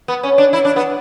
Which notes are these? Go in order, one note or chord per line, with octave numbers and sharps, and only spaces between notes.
B3
C#4
D4
E4
D4
B3